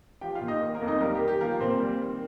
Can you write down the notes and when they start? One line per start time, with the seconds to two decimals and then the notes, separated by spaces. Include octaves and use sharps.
0.21 F3 G4 G5
0.35 F4 F5
0.41 A#2
0.48 D#4 D#5
0.61 D#3
0.74 A#3 A#4
0.81 F2
0.88 D#4 D#5
1.01 G3 A#3 A#4
1.15 G4
1.21 D#3
1.28 G4
1.41 F3 A#3 A#4
1.60 A#2 C4 C5
1.80 G3
2.01 D#3